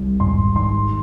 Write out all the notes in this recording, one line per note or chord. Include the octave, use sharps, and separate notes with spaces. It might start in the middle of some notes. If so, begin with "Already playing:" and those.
Already playing: C2
G#1 C6
D#3 C6